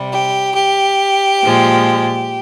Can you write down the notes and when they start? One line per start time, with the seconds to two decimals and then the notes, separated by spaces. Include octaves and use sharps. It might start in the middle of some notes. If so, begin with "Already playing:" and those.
Already playing: C3 G3
0.12 G4
0.56 G4
1.42 A#2 F3 G#3